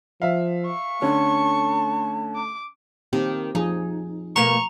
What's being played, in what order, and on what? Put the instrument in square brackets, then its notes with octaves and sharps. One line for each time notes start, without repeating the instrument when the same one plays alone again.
[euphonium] F3 [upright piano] E5 F5
[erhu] C#6
[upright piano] D3 C#4 [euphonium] A3 [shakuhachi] A5
[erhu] D6
[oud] D#3 [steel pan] A#3 C4 G4
[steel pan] F3 G#4 [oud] D#4
[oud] B2 A3 A#3 [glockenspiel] A#5 F7 [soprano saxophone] C#6